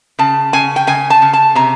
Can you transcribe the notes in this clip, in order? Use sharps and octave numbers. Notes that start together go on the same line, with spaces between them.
C#3 A5
C#3 G#5
G5
C#3 G#5
A5
C#3
A5
C3 A#5